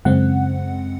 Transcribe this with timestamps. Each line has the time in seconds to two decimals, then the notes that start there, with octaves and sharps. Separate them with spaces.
0.05 F#2 C#3 G#3 C4 F#5